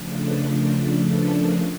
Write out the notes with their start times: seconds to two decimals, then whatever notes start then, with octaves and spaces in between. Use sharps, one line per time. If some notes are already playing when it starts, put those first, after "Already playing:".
Already playing: C#3 F3 A3 D4
0.18 A4 B4
0.47 A#4 C5
1.04 A4 B4
1.33 G#4 A#4